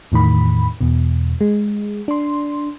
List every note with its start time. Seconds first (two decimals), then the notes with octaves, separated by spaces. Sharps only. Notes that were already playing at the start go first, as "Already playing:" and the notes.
0.12 E2 A2 D#3 B5
0.81 E2 B2
1.41 G#3
2.08 D4 C6